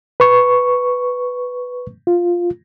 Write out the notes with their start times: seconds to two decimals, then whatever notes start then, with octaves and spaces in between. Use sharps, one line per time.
0.20 B4 C#6
2.07 F4